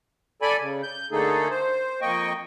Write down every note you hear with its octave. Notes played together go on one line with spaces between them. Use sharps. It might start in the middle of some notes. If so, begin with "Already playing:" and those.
A4 D5 G#5 B5
C#3
G6
D3 A3 A#3 D#4 G#4 A4
C5
F2 A#3 D#5 G5 C#6